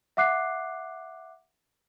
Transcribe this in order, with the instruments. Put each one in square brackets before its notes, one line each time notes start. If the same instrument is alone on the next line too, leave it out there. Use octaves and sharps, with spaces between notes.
[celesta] E5 F#5 D6 F#6 C7